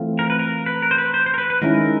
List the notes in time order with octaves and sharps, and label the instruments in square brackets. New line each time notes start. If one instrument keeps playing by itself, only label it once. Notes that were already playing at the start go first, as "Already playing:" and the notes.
Already playing: [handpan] E3 A3 C4 F4
[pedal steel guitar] A#4
B4
A#4
B4
A#4
C5
B4
C5
C5
A#4
B4
B4
[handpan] D#3 G#3 C#4 E4 [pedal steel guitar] A#4